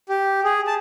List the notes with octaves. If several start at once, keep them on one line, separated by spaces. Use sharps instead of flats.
G4
G#4
A5